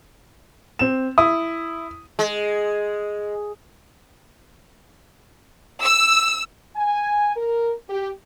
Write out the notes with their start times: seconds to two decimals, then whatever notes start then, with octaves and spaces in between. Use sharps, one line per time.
0.79 C4 E7
1.18 E4 D#6
2.19 G#3
5.83 E6
6.76 G#5
7.36 A#4
7.89 G4